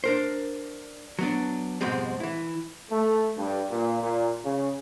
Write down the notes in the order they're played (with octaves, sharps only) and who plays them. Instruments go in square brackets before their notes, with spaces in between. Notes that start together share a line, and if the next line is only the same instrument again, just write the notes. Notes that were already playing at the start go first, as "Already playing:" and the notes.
[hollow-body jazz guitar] D4 A#4 C5
F#3 B3 D4
F2 G#2 B2 G3 G#3 C4
E3 E4
[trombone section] A3
G2
A#2
A#2
C#3